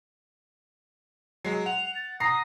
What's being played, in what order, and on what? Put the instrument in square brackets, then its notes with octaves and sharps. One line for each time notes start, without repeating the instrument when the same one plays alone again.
[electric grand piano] F#3 G#3 [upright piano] C7
[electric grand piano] F#5 [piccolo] F7
[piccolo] A6
[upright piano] A#5 A#6 C7 [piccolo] D#6